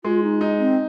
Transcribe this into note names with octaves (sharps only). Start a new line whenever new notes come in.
G#3 F4
D#4
D#4
C4